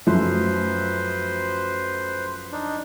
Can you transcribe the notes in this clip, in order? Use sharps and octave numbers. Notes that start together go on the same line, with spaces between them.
F#2 F3 A3 B4 C5
D4 D#4